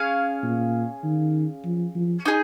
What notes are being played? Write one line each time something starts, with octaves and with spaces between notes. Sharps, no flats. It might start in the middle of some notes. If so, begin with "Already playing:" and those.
Already playing: C#4 G#4 F5
A#2
D#3
F3
F3
D#4 G#4